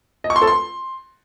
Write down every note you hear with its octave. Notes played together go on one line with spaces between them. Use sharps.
D#5
C#6
C6
A4
C6